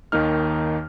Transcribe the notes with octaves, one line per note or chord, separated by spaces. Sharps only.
D#2 D#3 A#3 D#4 F6